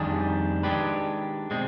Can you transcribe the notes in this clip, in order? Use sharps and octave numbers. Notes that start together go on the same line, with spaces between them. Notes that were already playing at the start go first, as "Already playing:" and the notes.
Already playing: F2 D#3 G3 D4 G#4
D#3 G#3 D4 G4 B4
B2 G#3 C4